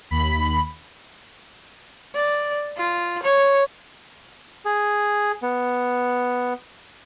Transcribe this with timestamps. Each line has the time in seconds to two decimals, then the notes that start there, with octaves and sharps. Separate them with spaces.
0.11 D#2 B5
2.16 D5
2.77 F4
3.23 C#5
4.65 G#4
5.43 B3